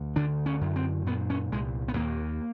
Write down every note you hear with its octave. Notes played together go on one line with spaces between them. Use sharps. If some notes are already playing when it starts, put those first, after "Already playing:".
Already playing: D2
D3 D4
C#4
F#2
C4
A#2 B3
C#4
C2 G#3
B3
D#2 A#3